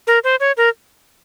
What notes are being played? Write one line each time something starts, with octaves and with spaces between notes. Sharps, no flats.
A#4
C5
C#5
A#4